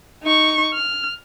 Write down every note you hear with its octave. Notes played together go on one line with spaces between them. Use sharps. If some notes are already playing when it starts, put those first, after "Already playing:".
D#4 C#6
F6